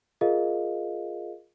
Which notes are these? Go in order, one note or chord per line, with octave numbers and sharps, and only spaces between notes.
F4 G#4 A#4 D#5 F5